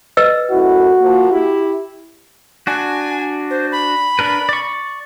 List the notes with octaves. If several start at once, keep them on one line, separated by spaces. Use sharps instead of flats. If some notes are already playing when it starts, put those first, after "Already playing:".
B4 D#5 E6
F#2 A3 E4 F#4
F3 A#3
E4 G4
D4 F#4 G#5
C5
B5
D4 A#4 B4
D5 C#6